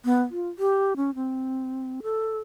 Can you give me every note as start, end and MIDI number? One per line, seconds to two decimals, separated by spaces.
0.05 0.21 59
0.31 0.48 65
0.59 0.93 67
0.97 1.14 61
1.15 2.01 60
2.03 2.38 69